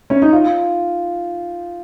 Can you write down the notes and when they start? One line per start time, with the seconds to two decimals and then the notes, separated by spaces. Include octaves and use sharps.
0.10 C#4
0.22 D#4
0.33 F4